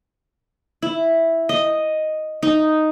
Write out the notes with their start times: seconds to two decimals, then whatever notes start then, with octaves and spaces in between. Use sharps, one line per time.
0.82 E4
1.49 D#5
2.43 D#4